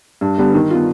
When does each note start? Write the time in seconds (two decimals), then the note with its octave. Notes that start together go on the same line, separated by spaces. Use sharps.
0.21 G2
0.38 D3 G3 B3
0.55 D#3
0.70 B3 F4